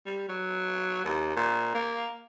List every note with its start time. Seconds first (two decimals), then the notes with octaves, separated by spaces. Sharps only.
0.06 G3
0.29 F#3
1.05 D#2
1.36 A#2
1.75 A#3